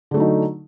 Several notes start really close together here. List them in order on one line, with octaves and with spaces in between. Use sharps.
D3 A3 F#3 D#4